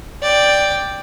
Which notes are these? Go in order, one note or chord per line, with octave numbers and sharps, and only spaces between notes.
D5 G5